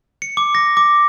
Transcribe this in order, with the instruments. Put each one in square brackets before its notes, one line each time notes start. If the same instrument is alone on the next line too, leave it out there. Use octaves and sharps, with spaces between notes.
[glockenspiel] C#7
D6
A#6
D6